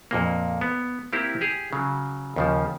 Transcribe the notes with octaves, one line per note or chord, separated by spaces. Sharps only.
F2 A#2 A#3
B3
A#3 C4 E4 G4
G4 G#4
C#3 F#3
D#2 C#3 F3